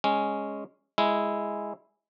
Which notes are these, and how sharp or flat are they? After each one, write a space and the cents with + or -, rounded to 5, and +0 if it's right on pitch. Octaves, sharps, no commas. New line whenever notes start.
G#3 +0 C#4 +0
G#3 +0 E4 +0